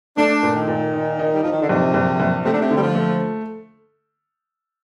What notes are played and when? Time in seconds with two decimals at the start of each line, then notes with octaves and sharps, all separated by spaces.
0.17 A3 D4
0.43 A#2
0.55 D#3
0.68 A#2
0.93 D#4
1.19 D#4
1.35 G3
1.43 F3 D#4
1.52 D#3
1.61 D3
1.69 A#1 C3
1.94 A#1
2.20 A#1
2.45 C3 A3
2.53 D3
2.61 C3
2.71 D3
2.76 G3
2.83 F3
2.95 A3